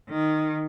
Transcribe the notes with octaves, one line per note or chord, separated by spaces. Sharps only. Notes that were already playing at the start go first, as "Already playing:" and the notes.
D#3